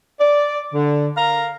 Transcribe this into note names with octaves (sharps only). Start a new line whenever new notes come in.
D5
D3
A#4 F5 A#5